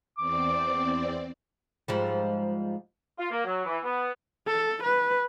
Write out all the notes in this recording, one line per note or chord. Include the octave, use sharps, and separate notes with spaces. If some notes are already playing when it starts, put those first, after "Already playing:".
E2 C4 D5 D6
G#2 F3 G3
F4
A#3
F#3
E3
B3
A4
B4